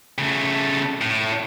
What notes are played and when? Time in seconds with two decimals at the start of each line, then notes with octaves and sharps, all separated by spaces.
0.18 C#3 A3
1.01 A2